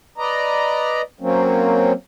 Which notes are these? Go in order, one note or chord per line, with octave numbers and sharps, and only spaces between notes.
B4 D5 D#5 A#5
F#3 A#3 C4 C#4